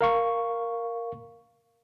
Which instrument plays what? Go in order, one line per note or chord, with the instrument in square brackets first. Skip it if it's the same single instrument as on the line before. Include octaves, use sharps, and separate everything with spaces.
[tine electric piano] A#4 F5 C#6